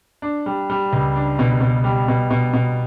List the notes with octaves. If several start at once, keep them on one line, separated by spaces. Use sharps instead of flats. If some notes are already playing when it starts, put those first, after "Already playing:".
D4
G3
G3
C#2
D4
B2
B2
G3
B2
B2
B2